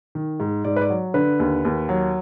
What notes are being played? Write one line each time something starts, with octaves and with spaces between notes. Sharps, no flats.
D#3
G#2
G#2 D5
B4
D5
F#3
D3 B4
D#2
D#2
F#3